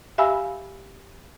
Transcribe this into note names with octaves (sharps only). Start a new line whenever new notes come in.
G4 E5 F5 G#5 B5 E6